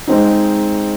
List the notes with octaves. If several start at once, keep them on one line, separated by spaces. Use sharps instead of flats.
G#3 C4 D#4